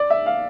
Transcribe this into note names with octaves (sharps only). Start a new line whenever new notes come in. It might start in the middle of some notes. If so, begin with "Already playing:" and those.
Already playing: D5
E5
F5